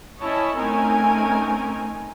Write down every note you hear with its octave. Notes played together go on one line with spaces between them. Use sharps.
C#4 E4 C#5 D#5 A5
A3 C4 C#4 D#4 A#4 G#5